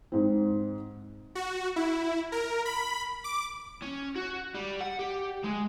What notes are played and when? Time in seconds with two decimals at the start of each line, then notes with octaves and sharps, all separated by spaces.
0.12 G#2 C4
1.35 F#4
1.76 E4
2.32 A#4
2.65 B5
3.24 D6
3.82 C#4
4.16 F#4
4.55 G3
4.81 F#5
4.99 G4
5.44 G#3